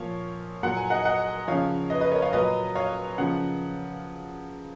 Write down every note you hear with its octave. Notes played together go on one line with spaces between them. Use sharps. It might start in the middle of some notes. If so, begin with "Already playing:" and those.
Already playing: A#2 F3 C#5 F5
A#2 F#3 F#5
G#5
D#5 F#5
D#5 F#5
C#3 F3 C#5 F5
B4 D#5
B4 D#5
A#4 C#5
C#5 F5
A#2 F#3 B4 D#5
C#5 F5
C#3 F3 F#5